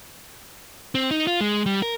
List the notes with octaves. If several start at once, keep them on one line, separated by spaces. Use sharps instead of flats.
C4
D#4
F4
G#3
G3
A#4